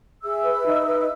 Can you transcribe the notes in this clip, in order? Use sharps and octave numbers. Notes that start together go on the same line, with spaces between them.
G#4 E5 E6
B4
D#4
B4